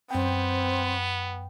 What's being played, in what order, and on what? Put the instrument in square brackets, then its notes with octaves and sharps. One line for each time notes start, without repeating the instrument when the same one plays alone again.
[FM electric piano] F#2 G5 [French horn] B3 [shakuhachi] C4